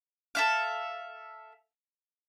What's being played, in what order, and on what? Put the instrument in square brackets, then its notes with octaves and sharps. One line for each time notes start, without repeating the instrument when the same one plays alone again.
[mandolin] A4 E5 F5